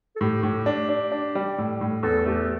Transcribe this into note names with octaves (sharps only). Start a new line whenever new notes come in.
A4
A2 G4
A2
D4
D4
D4
G3
A2
A2
E2 A4
A3 G4